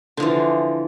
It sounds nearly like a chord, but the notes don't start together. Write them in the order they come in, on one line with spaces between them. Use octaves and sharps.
D3 F3 E3